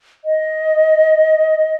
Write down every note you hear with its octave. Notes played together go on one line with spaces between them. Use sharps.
D#5